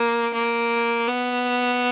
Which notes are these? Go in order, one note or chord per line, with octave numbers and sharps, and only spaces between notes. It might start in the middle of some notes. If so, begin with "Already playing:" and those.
Already playing: A#3
A#3
B3